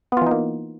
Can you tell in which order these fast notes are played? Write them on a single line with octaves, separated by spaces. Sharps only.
B3 F4 E3 D#4 A#3